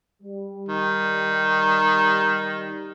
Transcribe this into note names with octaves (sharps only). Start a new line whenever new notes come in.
G3
D#3